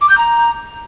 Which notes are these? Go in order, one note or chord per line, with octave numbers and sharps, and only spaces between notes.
D6
G6
A#5